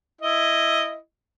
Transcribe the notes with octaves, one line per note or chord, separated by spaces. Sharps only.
E4 D#5